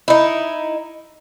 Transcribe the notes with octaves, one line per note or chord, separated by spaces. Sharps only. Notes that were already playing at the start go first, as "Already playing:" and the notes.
D#4 E4